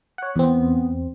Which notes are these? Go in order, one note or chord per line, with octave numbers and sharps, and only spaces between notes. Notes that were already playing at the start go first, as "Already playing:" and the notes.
C#5 F#5
E2 B3 C4